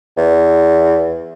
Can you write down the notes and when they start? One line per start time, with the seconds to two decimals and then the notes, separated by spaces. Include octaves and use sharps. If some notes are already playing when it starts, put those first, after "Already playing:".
0.17 E2